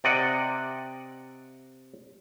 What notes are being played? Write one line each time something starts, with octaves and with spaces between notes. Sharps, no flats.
C3 D5 D#5 F#5